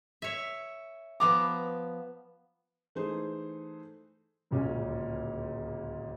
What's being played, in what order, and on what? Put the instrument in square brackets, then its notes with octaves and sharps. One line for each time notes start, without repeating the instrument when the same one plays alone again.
[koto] C#5 E5
[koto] F3 B3 A#5 [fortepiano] D6
[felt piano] E3 A3 D#4 G#4 C5
[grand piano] D1 C#2 A#2 C#4